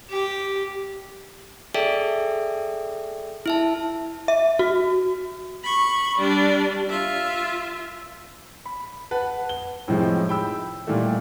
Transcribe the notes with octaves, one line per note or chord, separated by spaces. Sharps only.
G4
G#4 A4 D5 E5 G5
E4 E5 A5
E5
F#4
B5 C#6
G3 D4
F4 E5
B5
B4 F#5 A5
G7
A2 C3 D#3 F3 G#3
G5 B5 E6
A#2 D#3 E3 G3 A3